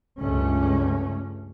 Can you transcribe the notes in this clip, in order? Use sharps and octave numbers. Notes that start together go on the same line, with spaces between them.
C#2 G2 A3 C#4